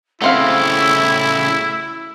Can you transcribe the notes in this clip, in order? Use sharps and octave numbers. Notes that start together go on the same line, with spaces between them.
C#3 F#3 A3 C4 E4 F5 E6